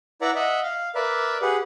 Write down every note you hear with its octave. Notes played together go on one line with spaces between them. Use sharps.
E4 B4 D5 E5 F#5 A#5
D#5 E5 F#5
F5
A#4 B4 D5 E5
G4 G#4 B4 F#5